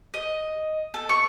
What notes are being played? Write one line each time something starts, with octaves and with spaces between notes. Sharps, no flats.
D#5
A4
C#6